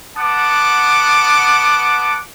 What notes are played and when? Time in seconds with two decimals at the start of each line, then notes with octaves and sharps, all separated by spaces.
0.17 B3 F#5 A5 D6